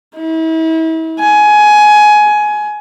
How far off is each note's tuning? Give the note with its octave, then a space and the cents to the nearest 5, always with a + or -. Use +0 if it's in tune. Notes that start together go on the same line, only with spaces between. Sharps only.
E4 -40
G#5 +20